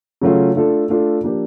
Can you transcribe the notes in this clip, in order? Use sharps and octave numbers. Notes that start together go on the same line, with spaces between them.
C#3 F#3 A3 C#4 F4
A3 D4 F4 A4
A3 D4 F4 A4
F3 A#3 D4 G4